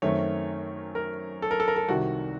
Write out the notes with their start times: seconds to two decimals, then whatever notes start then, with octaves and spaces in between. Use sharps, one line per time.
0.02 F#2 D#3 A3 C4 C#5
0.95 A#4
1.42 A4
1.51 A#4
1.60 A4
1.68 A#4
1.76 A4
1.88 C2 C3 D#3 F#4